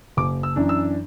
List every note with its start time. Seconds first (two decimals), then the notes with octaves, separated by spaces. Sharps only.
0.17 F#1 D6
0.43 E6
0.56 F#2 E3 D4
0.69 E6